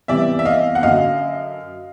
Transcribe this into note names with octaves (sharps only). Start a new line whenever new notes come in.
E2 C3 E3 G3 D5 E5
E5
D#5 F5
F#5
F#2 D3 F#3 D#5 F5